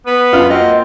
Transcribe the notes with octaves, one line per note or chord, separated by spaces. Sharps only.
B3 B4
F#2 F4 F6 F7
A#3 C4 F#4 D#5 F#5